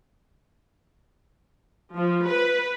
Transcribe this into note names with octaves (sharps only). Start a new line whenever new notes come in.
F3
B4